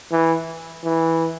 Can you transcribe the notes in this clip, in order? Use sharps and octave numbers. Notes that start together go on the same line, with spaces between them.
E3
E3